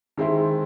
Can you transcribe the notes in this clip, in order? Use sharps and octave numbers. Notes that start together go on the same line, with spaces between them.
D#3 G#3 C4 E4